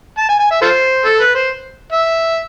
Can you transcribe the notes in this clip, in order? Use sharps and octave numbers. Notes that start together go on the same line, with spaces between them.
A5
G#5
G#5
E5
F4 A4 C5
A4
B4
C5
E5